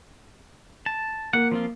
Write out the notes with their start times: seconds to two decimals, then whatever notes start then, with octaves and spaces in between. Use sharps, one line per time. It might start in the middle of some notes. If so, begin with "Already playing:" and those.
0.86 A5
1.33 A#3 F#5
1.51 F3 C4 F4